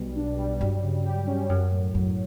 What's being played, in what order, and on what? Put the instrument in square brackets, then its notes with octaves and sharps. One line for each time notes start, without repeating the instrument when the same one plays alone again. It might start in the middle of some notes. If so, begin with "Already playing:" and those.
Already playing: [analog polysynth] B1 B2 G3
D4
G3
[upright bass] G2 [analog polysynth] F#3
[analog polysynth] C#3
G4
C#4
[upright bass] F#2 [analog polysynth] F#3
[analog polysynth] A2
[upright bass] F#2 [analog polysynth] A2